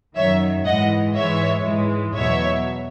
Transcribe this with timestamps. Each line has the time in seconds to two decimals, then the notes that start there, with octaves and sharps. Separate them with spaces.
0.16 F#2 D#3 F#3 C#5 E5
0.65 G#2 E3 G#3 D#5 F#5
1.15 G#2 E3 G#3 C#5 E5
1.65 G#2 E3 G#3
2.15 E2 B2 F#3 C#5 E5